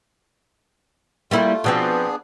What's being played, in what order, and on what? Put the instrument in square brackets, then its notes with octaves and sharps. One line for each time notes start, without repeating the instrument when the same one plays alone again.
[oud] G3 A#3 E4 [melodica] A3 F4
[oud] B2 F3 C4 [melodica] B3 D4 G#4